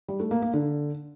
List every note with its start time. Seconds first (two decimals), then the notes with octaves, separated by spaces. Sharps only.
0.08 G3
0.20 A3
0.31 A#3
0.42 A#3
0.53 D3